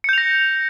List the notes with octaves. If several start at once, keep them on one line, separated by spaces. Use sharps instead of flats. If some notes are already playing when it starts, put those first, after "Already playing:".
G6 A#6 C#7 F7